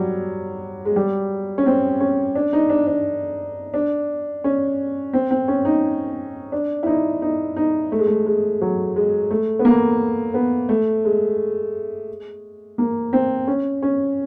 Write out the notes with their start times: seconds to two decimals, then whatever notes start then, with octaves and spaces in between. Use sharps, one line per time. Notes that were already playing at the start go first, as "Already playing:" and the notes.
Already playing: F#3 G3
0.85 G#3
0.96 G3
1.58 C#4
1.66 C4
2.01 C#4
2.35 D4
2.53 D#4
2.70 D4
2.87 D4
3.74 D4
4.44 C#4
5.13 C4
5.31 C4
5.48 C#4
5.65 D#4
6.52 D4
6.83 E4
6.86 D#4
7.22 D#4
7.56 D#4
7.92 A3
7.99 G#3
8.07 A3
8.26 G#3
8.61 F#3
8.96 G#3
9.31 A3
9.59 B3
9.65 A#3
10.34 B3
10.69 A3
11.05 G#3
12.78 A#3
13.13 C4
13.47 C#4
13.82 C#4